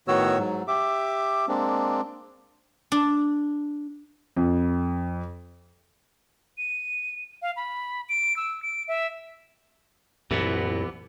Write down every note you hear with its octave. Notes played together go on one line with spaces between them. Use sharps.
A2 D#3 B3 F#4 C#5 E6
G#2 F#3
G4 E5 D6
G#3 A#3 C4 D4
D4
F2
D#7
F5
B5
D7
E6
D7
E5
C2 F#2 A#2 E3 B3